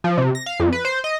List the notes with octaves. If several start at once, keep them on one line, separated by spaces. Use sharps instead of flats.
F3
C3
A#6
F5
F2
B4
C5
D#5